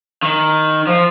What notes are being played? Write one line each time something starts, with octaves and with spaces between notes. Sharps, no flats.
D#3
F3